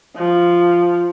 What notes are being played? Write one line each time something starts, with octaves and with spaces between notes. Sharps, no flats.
F3